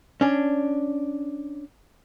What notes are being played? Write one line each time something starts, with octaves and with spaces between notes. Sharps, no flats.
C#4 D4